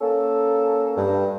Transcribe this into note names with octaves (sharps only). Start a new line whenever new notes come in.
A#3 C#4 A4
G2